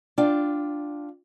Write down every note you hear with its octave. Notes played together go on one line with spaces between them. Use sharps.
D4 F4 G5